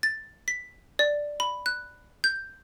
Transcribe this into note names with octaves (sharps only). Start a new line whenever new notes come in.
A6
B6
D5
B5
F#6
G6